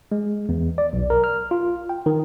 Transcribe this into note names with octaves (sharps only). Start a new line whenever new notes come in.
G#3
E2
D5
B1
A#4
F6
F4
G5
D#3